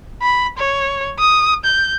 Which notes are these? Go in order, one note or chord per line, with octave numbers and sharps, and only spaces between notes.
B5
C#5
D#6
G6